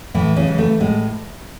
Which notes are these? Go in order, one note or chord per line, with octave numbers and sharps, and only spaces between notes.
A2 E3 E4
C#3 C#4
E3 G#3
A3
A2 G#3